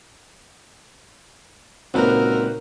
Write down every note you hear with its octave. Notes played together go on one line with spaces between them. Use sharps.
C#2 A#2 C4 D#4 F#4 A#4 B4